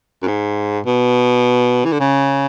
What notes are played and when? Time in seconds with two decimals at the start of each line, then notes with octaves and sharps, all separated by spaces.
0.22 F#2
0.28 G#2
0.86 B2
1.85 E3
1.92 D3
2.00 C#3